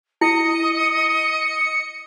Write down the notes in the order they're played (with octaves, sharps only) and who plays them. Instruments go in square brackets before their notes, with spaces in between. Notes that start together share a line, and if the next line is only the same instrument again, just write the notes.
[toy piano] E4 [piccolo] D#5 [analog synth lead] C#7